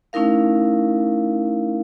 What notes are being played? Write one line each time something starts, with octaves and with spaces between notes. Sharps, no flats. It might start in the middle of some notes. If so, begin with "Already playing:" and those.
A3 C#4 D#4 E4 A#4 F5